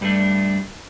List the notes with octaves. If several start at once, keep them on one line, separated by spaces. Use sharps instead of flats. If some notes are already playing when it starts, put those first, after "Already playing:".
G2 G3 A3 D4